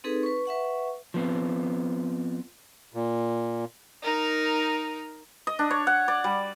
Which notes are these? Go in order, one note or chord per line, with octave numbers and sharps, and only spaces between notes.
C4 D#4 G#4 A4 B4
B4 C#6
B4 E5 F#5 C#6
F3 B3 C4
A#2
D#4 A#4
D#5
D4
C#5
F#5
D5
G3